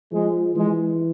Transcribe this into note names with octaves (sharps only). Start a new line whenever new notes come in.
F3 G#3
E3 G#3